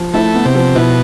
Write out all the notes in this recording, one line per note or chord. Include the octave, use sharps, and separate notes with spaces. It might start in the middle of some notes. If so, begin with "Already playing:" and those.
Already playing: F3
A3 E4
B3
C3
F3
B2 E4